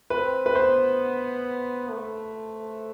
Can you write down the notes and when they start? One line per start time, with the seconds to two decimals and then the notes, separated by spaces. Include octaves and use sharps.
0.10 C4 B4
0.46 B4
0.55 B3 C5
1.90 A3